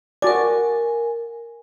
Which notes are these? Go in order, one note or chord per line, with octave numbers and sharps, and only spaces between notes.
F#4 A#4 D5 G#5